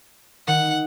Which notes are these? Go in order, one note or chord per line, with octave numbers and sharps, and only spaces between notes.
D#3 F#5